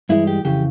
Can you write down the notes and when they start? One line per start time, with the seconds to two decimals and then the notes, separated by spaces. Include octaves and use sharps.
0.09 G2 E3 G#3 E4
0.27 G4
0.45 F2 C#3 E3 G4